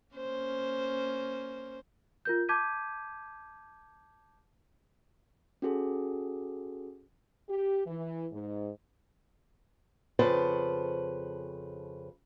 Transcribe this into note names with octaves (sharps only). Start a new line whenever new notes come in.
A#3 C#4 C5
F4 A#4 G6
A5 D6 G6 G#6 B6 D#7
C#4 F#4 G#4 A4
G4
E3
G#2
F2 C#3 B4 C5 A5